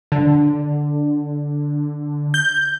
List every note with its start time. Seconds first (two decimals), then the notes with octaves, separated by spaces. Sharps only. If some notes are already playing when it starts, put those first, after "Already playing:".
0.12 D3
2.34 G6